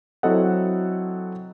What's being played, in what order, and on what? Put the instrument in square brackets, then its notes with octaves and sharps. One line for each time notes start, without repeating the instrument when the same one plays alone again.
[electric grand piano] F#3 C4 E4 A4 D#5 F#5